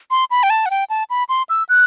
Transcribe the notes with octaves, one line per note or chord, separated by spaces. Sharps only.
C6
B5
G5
A5
F#5
G5
A5
B5
C6
E6
F#6